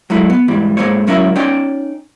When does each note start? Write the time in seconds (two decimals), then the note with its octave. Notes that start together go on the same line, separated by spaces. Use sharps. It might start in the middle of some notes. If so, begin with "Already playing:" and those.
0.10 F#3 G#3 A3 E4
0.30 B3
0.48 G#2 E3 G3
0.77 G#2 C3 A#3 C5 C#5
1.07 C#2 F#3 C#4 E4 A#4 E5
1.36 C#4 D#4 C#5 D5 G5